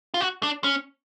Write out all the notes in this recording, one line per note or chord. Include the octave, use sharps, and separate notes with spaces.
F4
F#4
D4
C#4